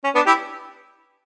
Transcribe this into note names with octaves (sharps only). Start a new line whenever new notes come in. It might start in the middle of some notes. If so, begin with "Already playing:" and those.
C#4
B3 D4
E4 G4